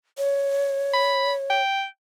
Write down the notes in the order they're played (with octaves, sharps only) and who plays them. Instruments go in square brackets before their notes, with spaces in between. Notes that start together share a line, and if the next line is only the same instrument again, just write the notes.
[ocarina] C#5
[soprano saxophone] B5
G5